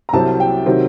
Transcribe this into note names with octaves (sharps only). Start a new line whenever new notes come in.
A#5
C2 C3 F#3 C4 A5
G5
C3 D#3 F#3 C4